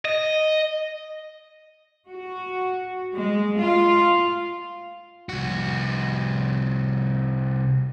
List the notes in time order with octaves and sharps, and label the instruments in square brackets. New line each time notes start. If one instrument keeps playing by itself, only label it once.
[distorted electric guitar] D#5
[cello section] F#4
G#3
F4
[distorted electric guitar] C2 F#4